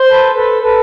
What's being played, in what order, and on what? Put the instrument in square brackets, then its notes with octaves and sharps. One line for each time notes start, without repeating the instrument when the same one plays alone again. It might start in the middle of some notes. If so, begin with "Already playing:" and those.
Already playing: [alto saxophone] C5
[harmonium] A4 B4
A4 B4
A4 B4